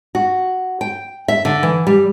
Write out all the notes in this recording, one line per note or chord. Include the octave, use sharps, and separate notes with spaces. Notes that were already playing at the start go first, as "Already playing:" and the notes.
F#4
G5
E5
D3
E3
G3